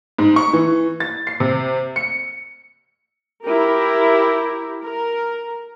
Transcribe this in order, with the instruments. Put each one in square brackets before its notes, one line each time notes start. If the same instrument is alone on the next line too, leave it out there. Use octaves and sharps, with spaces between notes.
[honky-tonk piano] G#2
C#6
E3
A6
C7
C3
C#7
[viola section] E4 G4 A#4
A#4